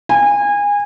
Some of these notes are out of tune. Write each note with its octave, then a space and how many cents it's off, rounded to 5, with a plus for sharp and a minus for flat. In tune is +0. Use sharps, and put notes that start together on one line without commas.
G#5 -25